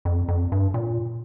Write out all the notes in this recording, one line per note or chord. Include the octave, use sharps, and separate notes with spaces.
F2
F2
G2
A#2